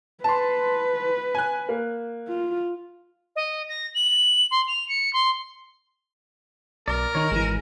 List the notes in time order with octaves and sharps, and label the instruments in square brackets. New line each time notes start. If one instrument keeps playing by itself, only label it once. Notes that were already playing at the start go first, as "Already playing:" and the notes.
[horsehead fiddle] B4 [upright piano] A5 C6
[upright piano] G#5 F#6
A#3
[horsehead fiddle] F4
[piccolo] D#5
A#6
F#7
C6
F7
C#7
C6
[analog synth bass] B1 [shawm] A#4 [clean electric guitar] D5
[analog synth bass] D#3 [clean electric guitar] D#4 C#5
[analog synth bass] G#1 [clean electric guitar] E3 G#3